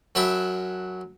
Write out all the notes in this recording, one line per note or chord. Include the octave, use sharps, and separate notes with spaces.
F#2 F#3 E5 G5 A5 B5